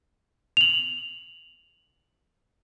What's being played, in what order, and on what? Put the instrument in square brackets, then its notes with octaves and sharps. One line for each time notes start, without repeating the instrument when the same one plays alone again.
[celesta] F7 F#7